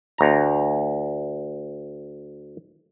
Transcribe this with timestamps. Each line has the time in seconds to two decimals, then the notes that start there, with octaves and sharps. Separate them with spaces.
0.18 D2 A#5